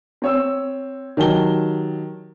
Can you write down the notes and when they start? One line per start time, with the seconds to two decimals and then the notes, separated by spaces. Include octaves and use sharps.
0.22 C4 C#5 E6
1.17 D#3 F#3 G4 A5 G7